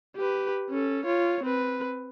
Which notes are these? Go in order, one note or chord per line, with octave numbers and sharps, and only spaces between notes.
G4 B4
C#4 A4
F4 C#5
C4 B4